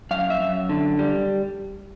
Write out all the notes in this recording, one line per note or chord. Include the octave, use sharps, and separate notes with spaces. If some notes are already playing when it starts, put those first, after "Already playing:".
F#2 F5
E5
F#2
D3
G3